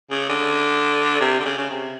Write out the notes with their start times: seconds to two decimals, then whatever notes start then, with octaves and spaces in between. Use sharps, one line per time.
0.10 C#3
0.29 D3
1.20 C3
1.39 D3
1.45 C#3
1.57 C#3
1.70 C3